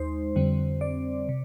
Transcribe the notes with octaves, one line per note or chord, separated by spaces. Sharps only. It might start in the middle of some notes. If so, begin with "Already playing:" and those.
Already playing: D#2 G#3 D#4 C5
F2 D3 G3 C4
D5
C3